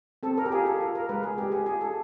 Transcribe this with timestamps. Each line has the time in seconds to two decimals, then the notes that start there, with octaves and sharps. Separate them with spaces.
0.23 C4 A4
0.37 A#4
0.45 G4
0.52 F4 G#4
0.66 A4
0.81 F4
0.95 A#4
1.09 G#3 B4
1.23 G#4
1.38 G#3 G4
1.52 G#4
1.66 F4 G#4
1.81 A4